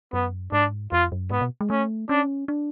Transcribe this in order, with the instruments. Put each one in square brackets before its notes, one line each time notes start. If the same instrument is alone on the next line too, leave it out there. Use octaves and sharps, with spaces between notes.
[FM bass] F#2 [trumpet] B3
[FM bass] G#2 [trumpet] D4
[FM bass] F2 [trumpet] F4
[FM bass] F#2
[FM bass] G#2 [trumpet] B3
[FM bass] B2
G#3
[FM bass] A3 [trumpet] C#4
[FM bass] C#4 [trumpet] D4
[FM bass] D4